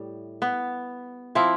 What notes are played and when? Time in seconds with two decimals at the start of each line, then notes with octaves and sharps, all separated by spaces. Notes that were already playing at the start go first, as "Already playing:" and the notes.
Already playing: A2 G3
0.42 B3
1.35 F3 C4 E4